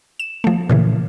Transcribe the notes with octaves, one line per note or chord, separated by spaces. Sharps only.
E7
F3 A3
A#2 C#3 E3